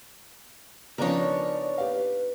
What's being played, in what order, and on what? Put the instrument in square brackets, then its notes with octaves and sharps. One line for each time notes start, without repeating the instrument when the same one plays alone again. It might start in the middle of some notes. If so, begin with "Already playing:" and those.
[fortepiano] C#3 F3 [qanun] B3 D4 D#4 [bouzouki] A#4 C#5 [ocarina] D5
[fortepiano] G4 F5 [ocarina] B4